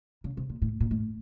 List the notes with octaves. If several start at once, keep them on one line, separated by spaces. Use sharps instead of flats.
C#3
C3
A#2
A2
A#2
A2